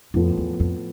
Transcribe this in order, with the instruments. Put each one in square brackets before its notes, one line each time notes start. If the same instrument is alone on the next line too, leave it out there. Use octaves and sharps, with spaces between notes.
[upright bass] F2 [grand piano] A2 F3 B3 F4 A4
[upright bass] E2
F2